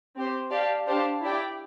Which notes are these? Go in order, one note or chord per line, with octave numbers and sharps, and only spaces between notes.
C4 G4 C5
G4 D5 F5 A5
D4 G4 C5 F5 A5
E4 G4 D5 G5